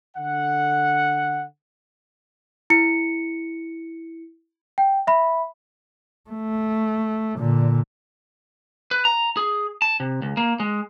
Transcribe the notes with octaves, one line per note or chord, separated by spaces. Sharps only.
D3 F#5
E4 C#7
G5
E5 B5
A3
A#2 D3
B4
A#5
G#4
A5
C3
C#2
A#3
G#3